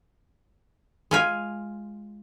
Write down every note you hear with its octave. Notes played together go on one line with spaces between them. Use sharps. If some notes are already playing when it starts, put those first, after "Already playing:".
G#3 F4 G#5